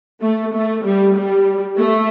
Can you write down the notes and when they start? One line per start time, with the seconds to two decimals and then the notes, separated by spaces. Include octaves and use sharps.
0.22 A3
0.54 A3
0.84 G3
1.15 G3
1.78 A3